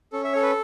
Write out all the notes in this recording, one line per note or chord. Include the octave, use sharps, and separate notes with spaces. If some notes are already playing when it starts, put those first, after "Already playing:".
C#4 A4
E5
A4 C#5
B4